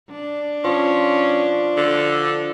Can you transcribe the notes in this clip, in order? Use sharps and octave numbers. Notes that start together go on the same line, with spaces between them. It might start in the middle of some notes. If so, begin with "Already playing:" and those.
D4
F3 C#4
D3